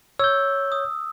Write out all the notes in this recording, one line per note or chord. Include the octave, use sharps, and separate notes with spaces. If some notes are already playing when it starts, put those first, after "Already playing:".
C#5 E6 G6
D#6